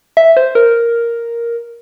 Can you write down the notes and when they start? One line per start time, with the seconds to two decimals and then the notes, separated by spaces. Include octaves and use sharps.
0.17 E5
0.37 C5
0.55 A#4